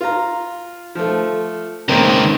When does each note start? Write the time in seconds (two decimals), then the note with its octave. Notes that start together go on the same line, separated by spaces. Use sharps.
0.01 F4 A#5
0.95 F3 A3
1.89 C#2 D#3 A#3 C4